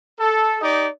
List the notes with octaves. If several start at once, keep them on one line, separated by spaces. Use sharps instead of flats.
A4
D#4 G4 D5 D#5